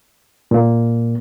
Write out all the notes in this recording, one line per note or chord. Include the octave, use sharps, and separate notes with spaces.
A#2 A#3